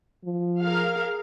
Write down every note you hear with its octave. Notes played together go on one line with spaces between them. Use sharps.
F3
G#4 A#4 F5